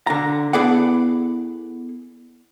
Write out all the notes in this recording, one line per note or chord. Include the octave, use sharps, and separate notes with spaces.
D3 A#5
B3 E4 G#4 A4 D5 F#5